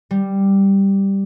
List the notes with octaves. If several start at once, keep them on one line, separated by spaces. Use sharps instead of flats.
G3